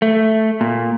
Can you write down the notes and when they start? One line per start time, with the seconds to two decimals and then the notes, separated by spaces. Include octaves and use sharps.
0.02 A3
0.61 A#2